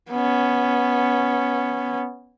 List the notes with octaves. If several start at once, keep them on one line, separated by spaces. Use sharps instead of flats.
B3 C#4